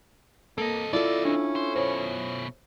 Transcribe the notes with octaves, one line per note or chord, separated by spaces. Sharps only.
A#3 C4 A4 D#5
E4 F4 A4 D5
C#4 D4
C5
F#2 B2 C5 C#5